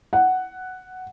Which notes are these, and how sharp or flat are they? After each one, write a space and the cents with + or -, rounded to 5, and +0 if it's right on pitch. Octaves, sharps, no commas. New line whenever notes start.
F#5 +5